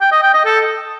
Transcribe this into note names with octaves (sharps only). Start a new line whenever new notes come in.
G5
D#5
G5
D#5
A4